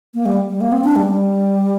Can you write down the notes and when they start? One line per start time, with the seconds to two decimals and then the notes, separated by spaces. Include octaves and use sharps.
0.14 A#3
0.26 G3
0.49 G3
0.61 A#3
0.72 C4
0.84 D4
0.96 G3
1.08 G3